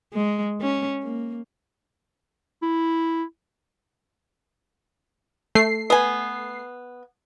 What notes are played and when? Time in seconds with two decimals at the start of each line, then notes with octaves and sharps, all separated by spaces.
0.14 G#3
0.61 C#4
1.04 A#3
2.62 E4
5.55 A3 C7
5.90 B3 G#5